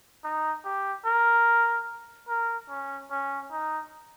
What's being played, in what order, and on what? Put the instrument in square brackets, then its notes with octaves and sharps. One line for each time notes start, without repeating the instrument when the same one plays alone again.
[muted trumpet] D#4
G4
A#4
A#4
C#4
C#4
D#4